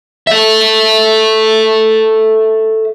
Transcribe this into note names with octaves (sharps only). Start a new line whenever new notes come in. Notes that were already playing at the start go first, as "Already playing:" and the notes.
A4 E5